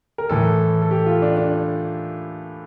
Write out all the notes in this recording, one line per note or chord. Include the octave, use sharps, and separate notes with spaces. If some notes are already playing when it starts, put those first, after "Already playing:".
A#4
A2 E3 A4
A4
G4
F4
D4
D4